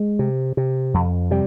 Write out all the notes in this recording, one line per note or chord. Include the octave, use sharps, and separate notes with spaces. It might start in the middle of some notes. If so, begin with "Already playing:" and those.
Already playing: G#3
C3
C3
F2
C3 G3